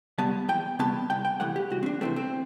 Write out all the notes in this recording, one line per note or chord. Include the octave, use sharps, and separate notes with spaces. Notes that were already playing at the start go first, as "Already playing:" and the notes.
C3 G3 B3 A5
E2 G5
C3 G3 B3 A5
C2 G5
G5
C3 E3 A3 F#5
G4
C2 F#4
C4
D4
C3 E3 A3 C4
C4